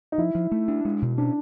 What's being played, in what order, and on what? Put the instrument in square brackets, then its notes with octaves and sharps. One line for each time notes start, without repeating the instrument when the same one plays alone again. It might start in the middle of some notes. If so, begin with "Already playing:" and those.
[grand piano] D#4
[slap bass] F3 [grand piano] E4
[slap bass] F3
A3
D4
G#3
B2
[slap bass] C#4 [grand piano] D4